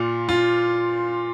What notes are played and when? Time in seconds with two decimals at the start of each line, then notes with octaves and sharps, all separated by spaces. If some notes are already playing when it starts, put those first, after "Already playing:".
Already playing: A#2 F4
0.29 F4